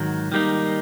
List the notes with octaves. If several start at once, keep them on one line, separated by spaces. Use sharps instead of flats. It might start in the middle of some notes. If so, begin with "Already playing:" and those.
Already playing: G#2 D#3 F#3
D#3 G3 A#3 D#4